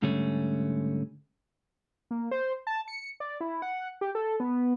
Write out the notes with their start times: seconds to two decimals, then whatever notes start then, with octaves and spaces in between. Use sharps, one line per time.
0.02 G#2 D3 G3 A3 C#4
2.11 A#3
2.31 C5
2.67 A5
2.88 C#7
3.20 D5
3.41 E4
3.62 F#5
4.01 G4
4.15 A4
4.40 B3